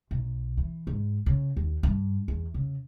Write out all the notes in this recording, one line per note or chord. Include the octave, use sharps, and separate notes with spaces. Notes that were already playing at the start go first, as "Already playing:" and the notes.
B1
E3
G#2
C#3
D#2
G2
E2
C#3